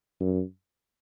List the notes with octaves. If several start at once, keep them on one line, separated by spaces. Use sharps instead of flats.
F#2